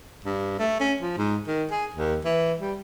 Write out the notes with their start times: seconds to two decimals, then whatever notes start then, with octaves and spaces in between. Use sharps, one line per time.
0.25 G2
0.59 A3
0.80 C#4
1.01 F3
1.17 G#2
1.47 D#3
1.71 G#4
1.94 D#2
2.25 E3
2.61 G3